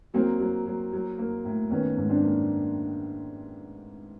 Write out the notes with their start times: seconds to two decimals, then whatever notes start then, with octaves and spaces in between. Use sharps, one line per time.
0.14 F#3 A#3 C4
0.40 F#3
0.66 F#3
0.93 F#3
1.18 A#3
1.45 A2
1.70 D#3 B3 C#4
1.97 G#2
2.09 C4 D4
2.23 A#3